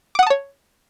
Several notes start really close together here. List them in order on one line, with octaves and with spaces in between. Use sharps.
D6 F#5 D#6 A5 C#5